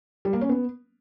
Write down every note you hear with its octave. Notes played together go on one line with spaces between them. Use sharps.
G3
A#3
C#4
B3